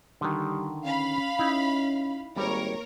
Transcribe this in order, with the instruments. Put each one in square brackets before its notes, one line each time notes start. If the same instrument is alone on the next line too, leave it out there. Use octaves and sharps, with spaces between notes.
[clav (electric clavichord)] D3 D#3 [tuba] G3
[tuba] C#4 [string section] F5 B5
[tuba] C#4 [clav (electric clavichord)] D#4 E4
[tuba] G#1 [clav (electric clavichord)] G3 [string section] A#3 A#4 C#5